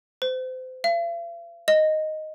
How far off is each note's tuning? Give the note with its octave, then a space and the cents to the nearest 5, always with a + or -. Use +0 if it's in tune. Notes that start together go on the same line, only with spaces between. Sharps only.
C5 -30
F5 -45
D#5 +0